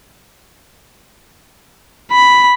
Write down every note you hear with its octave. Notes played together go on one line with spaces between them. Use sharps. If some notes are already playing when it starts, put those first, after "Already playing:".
B5